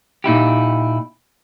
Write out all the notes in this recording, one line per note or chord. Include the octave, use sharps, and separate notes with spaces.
A#2 D#4 E4 G4